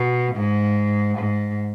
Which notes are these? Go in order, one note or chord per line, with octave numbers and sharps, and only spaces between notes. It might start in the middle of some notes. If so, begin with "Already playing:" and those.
Already playing: B2
G#2
G#2